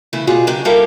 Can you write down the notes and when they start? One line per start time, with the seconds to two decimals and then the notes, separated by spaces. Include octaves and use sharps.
0.13 C#3 E3 A3 E4
0.27 B2 G3 F4 F#4 G#4
0.47 C#3 F#3 D4 G4
0.65 G3 E4 G4 A4 A#4 F5